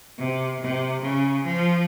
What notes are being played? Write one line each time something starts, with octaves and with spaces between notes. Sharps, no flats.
C3
C3
C#3
F3